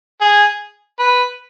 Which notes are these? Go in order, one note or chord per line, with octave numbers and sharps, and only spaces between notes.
G#4
B4